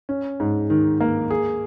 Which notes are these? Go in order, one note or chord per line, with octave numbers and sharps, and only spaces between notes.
C#4
G#2
D#3
A#3
G#4